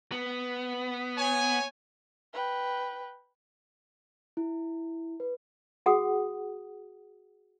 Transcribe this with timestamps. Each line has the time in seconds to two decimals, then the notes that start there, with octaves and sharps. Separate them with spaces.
0.12 B3
1.17 C#5 G#5
2.33 B4 G5
4.37 E4
5.20 B4
5.86 F#4 G#4 F#5 D#6